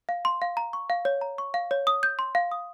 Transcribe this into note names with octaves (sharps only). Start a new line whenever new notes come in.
F5
C6
F5
A#5
C#6
F5
C#5
A#5
C#6
F5
C#5
D#6
G6
C6
F5
D#6